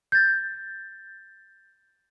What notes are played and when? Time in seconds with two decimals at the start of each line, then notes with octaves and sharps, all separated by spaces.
0.12 G6 A6